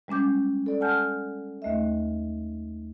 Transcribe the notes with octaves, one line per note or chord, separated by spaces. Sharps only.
G3 G#3 C#4 D6 G6
A4 D5
F#5 G#5 A5 F6 G6
D#2 A3 D#5 E5